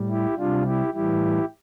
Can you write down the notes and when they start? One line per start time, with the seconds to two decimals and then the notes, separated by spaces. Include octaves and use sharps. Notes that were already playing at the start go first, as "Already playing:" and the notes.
Already playing: A2 G3
0.09 E4 G4
0.37 C3 G3 D4 F4
0.66 E4 G4
0.94 A2 E3 G3 E4 G4